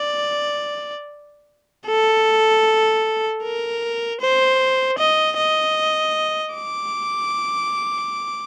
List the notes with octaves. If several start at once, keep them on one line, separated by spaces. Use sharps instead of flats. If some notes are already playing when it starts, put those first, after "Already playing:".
Already playing: D5
A4
A#4
C5
D#5
D#5
D6